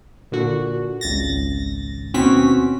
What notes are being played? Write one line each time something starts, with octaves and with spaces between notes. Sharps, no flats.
A#2 D3 F#4
G#1 C#2 A6 A#6
D#2 B2 C4 C#4 F#4 B6